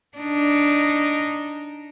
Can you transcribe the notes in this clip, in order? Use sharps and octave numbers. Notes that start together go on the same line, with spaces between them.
D4 D#4